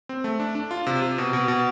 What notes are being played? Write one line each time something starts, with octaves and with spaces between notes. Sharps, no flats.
C4
A3
D4
D4
F4
C3
C3
B2
B2
B2